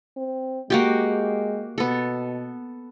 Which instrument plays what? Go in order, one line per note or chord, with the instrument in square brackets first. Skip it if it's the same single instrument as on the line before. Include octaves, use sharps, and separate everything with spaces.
[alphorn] C4
[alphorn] G#3 [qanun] A#3 F#4 G4
[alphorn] B2 [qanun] B3 A4